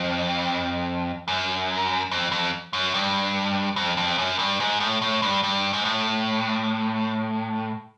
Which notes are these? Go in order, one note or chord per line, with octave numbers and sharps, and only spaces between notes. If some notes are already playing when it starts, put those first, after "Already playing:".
Already playing: F2
F#2
F2
F2
F#2
G2
F2
F2
F#2
G2
G#2
A2
A2
G2
G2
G#2
A2